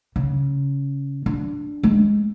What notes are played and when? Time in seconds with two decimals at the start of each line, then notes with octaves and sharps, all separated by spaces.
0.16 C#3
1.26 D4
1.83 G#3